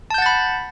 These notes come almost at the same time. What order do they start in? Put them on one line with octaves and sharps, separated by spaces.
A5 G6 F#5 A6 B5